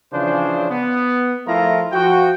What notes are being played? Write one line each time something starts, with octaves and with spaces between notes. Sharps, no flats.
C#3 E3 F3 D4 C5
B3
F3 A3 E4 F4 A#4 A#5
F3 F#4 G5